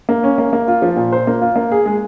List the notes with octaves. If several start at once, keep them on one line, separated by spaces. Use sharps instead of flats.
A#3
C#4
A#3
A#3
F4
F3
A#2
C5
A#3
F4
A#3
G#4
G#3